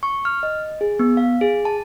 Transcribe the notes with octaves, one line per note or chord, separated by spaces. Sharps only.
C#6
F6
D#5
G#4
B3
F5
G#4
A5